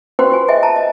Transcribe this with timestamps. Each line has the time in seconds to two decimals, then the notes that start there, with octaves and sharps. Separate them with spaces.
0.19 F#4 G4 B4 C5 F#5 G5
0.32 F4 G#5
0.48 G#4 D#5 E5 G5 G#5
0.63 A5 A#5
0.76 D#5